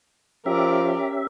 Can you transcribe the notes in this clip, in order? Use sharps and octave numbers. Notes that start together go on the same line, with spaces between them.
F3 C#4 G4 A#4 D5 E5